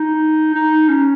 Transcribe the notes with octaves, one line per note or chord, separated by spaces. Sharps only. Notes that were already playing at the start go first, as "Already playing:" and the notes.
Already playing: D#4
D#4
C#4